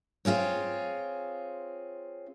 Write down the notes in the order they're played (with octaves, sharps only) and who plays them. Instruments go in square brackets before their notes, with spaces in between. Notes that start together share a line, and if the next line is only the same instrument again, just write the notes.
[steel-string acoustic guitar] C4 F4 G#4 C#5